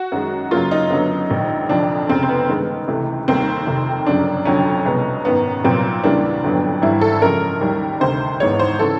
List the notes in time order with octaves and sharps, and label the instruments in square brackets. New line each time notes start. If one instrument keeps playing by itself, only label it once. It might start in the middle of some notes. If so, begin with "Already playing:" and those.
Already playing: [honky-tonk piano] F#4
F#2 D#3 G#3
F#2 C#3 F#3 A#3 F4
D#4
F#2 D3 F#3 B3
A#1 G#2 D#3
F1 F2 D3 F3 D4
F1 F2 C#3 C4
C4
B3
G2 D#3 G#3 B3
C#2 C3 E3 A3
F1 D#2 D#3 G3 A#3 C4
F1 F2 C3 D#3
G1 F#2 C#3 F#3 D4
F1 F2 D3 F#3 C#4
C2 B2 G#3 B3
G#1 F#2 D#3 B3
C2 A#2 F#3 B3 C4
E2 C#3 E3 G3 A#3 D4
G1 F2 D3 F#3 B3
G#1 G2 E3 G3 E4
A4
F#2 C#3 F3 G#3 A#4
D#2 D#3 G3
D2 C3 D#3 C5
G#1 G#2 E3 G#3 B3 C#5
C5
C#3 E3 A4